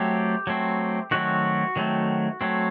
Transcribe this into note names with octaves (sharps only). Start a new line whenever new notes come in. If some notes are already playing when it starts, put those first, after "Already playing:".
Already playing: F#3 A3 C4 G4
F#3 A3 C4
D#3 F#3 A3 C4 F#4
D#3 F#3 A3 C4
F#3 A3 C4